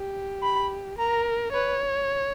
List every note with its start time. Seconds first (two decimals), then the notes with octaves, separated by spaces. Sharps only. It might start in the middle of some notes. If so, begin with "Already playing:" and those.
Already playing: G4
0.43 B5
0.98 A#4 A#5
1.53 B4 C#5